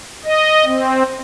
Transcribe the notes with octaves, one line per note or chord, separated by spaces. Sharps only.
D#5
C4